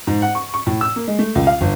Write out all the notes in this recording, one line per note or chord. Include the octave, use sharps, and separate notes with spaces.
G#2
F#5
C#6
C#6
A2
E6
A#3
G#3
A3
C#2
F5
G1